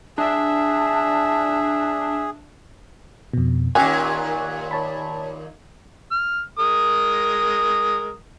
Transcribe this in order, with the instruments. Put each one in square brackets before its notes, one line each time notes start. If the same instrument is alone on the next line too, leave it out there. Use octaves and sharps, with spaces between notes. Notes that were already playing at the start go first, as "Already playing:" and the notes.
[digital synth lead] D4 [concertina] G#4 [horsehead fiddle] E5 [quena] A5
[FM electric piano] F2 B2
[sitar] D#2 A#2 [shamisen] C#4 G4 G#5 [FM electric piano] C#6 F#6
[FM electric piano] C#5 A5 B5
[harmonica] F6
G#3 A#4 D#6